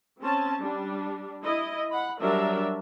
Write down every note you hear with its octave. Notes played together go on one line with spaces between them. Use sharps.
C4 C#4 A5
G3 D4
E4 D#5
F#5 B5
F#3 G3 D4 A#4 E5